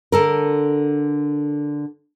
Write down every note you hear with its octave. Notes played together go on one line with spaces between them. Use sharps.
D3 A4 A#4